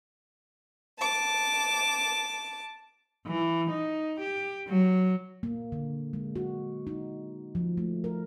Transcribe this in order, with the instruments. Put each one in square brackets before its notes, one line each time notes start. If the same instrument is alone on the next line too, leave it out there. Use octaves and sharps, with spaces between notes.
[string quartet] A5 D6
[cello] E3
D#4
G4
F#3
[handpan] A#3
D3
G#3
F#4
D#4
F3
A3
A#4